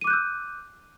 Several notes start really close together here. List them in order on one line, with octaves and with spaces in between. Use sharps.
D#7 D6 F#6 G6 E6